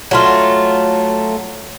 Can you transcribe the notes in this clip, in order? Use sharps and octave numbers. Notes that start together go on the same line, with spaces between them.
F#3 A3 F4